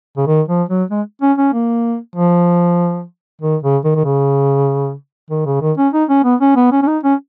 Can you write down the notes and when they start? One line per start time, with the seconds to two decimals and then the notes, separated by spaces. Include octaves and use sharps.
0.17 C#3
0.27 D#3
0.48 F3
0.69 F#3
0.90 G#3
1.21 C#4
1.38 C#4
1.53 A#3
2.15 F3
3.41 D#3
3.63 C#3
3.84 D#3
3.95 D#3
4.05 C#3
5.30 D#3
5.46 C#3
5.61 D#3
5.78 C#4
5.93 D#4
6.09 C#4
6.24 B3
6.41 C#4
6.56 B3
6.72 C#4
6.82 C#4
6.87 D#4
7.03 C#4